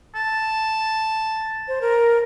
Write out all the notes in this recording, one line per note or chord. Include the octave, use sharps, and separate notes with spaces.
A5
C5
A#4